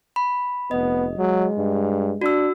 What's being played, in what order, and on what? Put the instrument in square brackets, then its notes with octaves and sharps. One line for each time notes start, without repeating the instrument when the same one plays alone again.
[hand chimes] B5
[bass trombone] F1 [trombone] B3 [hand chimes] D#5
[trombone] F#3 [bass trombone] G#3
[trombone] G2
[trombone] D4 [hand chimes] F#4 E6